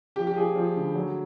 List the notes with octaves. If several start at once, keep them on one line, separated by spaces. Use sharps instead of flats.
F3 G4
G4
F3 G#4
F3
D2
F#3